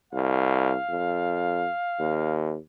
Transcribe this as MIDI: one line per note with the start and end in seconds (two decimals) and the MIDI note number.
0.13 0.75 36
0.13 2.37 77
0.89 1.67 41
2.00 2.57 39